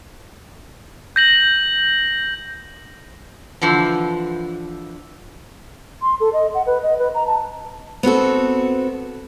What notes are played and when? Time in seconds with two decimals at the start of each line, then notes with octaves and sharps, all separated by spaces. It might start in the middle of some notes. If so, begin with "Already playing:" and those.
1.16 G6 A#6 F#7
3.62 D3 E3 F3
6.01 C6
6.20 A4
6.33 D#5
6.55 F#5
6.66 B4
6.83 D#5
6.99 B4
7.14 A#5
7.27 A5
8.03 B3 C4 F#4 A4